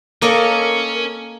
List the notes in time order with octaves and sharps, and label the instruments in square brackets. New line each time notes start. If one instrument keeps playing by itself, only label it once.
[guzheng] A#3 A4 D#5 [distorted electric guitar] C#4 [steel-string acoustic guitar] A#4 C#5